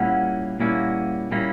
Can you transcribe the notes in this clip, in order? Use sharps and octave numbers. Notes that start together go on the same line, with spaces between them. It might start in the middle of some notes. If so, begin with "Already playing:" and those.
Already playing: A#2 G3 A#3 C#4 E4 F#5
A#2 G3 A#3 C#4 E4
A#2 G3 A#3 C#4 E4